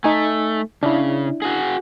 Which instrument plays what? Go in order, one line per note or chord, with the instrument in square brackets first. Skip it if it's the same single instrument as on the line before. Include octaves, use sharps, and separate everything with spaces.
[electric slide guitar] A3 [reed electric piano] D#4 G#5
[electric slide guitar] C#3 [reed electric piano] D4 E4
[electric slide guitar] F#4 G#4